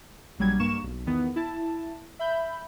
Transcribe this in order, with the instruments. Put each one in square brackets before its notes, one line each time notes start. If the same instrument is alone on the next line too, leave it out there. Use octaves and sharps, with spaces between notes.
[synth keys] A#1 F#3 G3 G#6
G2 A#3 C#6 E7
B1
E2 D#3 B3
E4 A5
E5 B5 G6